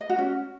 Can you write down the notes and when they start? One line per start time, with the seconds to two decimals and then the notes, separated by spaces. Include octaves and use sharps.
0.01 D#5
0.09 F#4
0.18 C#4